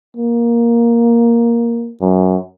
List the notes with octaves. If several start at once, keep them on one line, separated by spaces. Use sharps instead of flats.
A#3
F#2